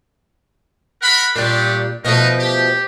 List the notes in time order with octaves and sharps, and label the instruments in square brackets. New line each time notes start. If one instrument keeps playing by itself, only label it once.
[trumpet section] A#4 F#5 B5
[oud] A#2 G3 [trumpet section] A3 D4 G4
[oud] B2 F3 A3 [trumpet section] D#4 A#4 B4
[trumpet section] G4